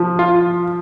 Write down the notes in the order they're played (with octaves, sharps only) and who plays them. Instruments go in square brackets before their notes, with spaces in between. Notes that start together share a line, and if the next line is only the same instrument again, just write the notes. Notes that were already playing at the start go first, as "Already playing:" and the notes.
Already playing: [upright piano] F3
[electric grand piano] F4